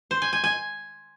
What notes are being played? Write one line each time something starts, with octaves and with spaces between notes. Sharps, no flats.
C5
G#5
G#5
G#5